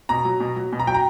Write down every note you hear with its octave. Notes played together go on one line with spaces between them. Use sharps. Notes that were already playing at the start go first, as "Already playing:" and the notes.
B2 A#5
F#3
B2
F#3
B2
A#5
F#3 G5
A#5